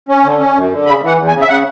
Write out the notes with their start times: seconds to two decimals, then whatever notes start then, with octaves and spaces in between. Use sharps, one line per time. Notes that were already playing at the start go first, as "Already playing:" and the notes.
0.09 C#4
0.24 D3
0.39 C#4
0.55 F#2
0.71 D3
0.86 C#3 B5
1.02 E3 F#5
1.17 E2
1.28 G#5
1.33 C#3
1.41 E5
1.48 C#3 F#5